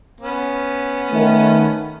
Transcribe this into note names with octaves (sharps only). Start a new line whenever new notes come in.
B3 C#4
D#3 A3